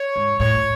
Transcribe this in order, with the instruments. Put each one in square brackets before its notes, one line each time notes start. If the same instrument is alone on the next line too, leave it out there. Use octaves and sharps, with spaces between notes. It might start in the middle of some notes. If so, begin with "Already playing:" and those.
Already playing: [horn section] C#5
[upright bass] G#2
[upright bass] A2 [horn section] C#5